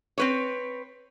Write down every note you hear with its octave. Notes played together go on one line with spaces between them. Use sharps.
C4 B4 C#5